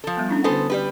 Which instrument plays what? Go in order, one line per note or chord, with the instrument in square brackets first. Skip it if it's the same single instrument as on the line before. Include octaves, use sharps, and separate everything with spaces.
[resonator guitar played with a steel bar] F3 A4
[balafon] G3 B3
C#4 D4 E4
[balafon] D3 F#4 G#5 [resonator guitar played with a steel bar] B3 A4 C5
[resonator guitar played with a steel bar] G3 G4 B4